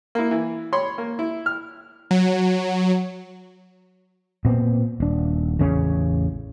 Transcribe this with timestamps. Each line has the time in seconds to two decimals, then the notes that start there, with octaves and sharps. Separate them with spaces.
0.15 A#3 E4
0.31 E3
0.73 C#5 B5 C6
0.98 A#3
1.19 E4
1.46 F6
2.11 F#3
4.45 A#2 B3 C4
5.00 D#1 D4
5.59 A1 E2 C#3 C#4